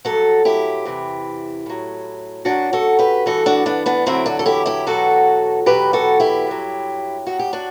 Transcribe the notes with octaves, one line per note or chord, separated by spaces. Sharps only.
G2 F#3 F#4 A4
E4 G4
E2 C3 E3
A2 F#3
F#2 F#3 D4 F#4
F#4 A4
G4 B4
G2 E3 F#4 A4
D4 F#4
B3 D4
B3 D4
E2 D3 F#3 C4 E4
D4 F#4
A4
E4 G4
E4 G4
E2 B2 F#3 F#4 A4
E2 B2 F#3 G4 B4
F#4 A4
E4 G4
G2 F#3
F#2 F#3 F#4
G4
D4 F#4